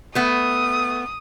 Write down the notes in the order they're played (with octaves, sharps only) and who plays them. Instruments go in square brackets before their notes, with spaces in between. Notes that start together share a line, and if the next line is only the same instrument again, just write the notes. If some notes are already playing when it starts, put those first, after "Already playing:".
[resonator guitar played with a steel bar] A3 B3 [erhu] D#6